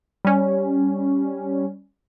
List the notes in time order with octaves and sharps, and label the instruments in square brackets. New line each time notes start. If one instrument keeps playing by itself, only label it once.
[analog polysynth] G3 C#4